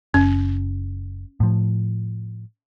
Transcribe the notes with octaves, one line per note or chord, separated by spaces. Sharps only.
F#1 C#4
A2 F3